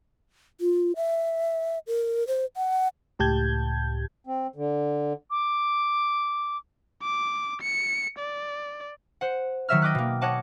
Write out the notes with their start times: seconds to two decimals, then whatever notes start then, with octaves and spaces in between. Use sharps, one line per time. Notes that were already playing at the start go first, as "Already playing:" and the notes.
0.61 F4
0.96 E5
1.87 A#4
2.27 C5
2.57 F#5
3.19 C#2 A2 G4 A5 G6 G#6
4.27 C4
4.56 D3
5.30 D6
7.02 D6
7.62 C#7
8.19 D5
9.21 C5 F#5
9.69 D#3 F#3 C#5 E5 E6 F6
9.81 D#5 G5 D6 D#6 F#6 B6
9.95 B2 A#3
10.21 C#5 D#5 F#5 A5 D6